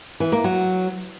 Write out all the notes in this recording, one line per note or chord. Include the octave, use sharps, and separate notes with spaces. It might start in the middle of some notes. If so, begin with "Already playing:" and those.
E3
A#3
F#3